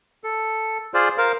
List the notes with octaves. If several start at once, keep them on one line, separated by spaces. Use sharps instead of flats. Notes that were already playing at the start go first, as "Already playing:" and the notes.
A4
F4 G#4 C5 D5
A#4 C5 F5